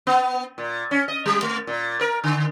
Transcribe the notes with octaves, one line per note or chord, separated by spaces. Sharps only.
B3
A#2
C#4
D#5
G3
A3
A#2
A#4
D3